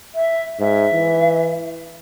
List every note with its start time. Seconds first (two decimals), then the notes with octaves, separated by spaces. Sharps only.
0.15 E5
0.59 G#2 E5
0.93 E3